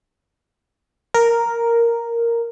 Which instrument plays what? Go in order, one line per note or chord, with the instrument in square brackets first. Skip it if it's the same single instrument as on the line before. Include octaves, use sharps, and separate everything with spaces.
[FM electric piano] A#4